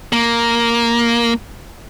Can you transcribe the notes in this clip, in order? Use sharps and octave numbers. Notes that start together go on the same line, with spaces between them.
A#3